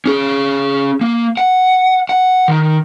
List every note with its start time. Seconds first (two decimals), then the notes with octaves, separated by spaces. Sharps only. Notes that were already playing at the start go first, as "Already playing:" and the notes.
0.06 C#4 G#4
1.01 A#3
1.37 F#5
2.09 F#5
2.48 D#3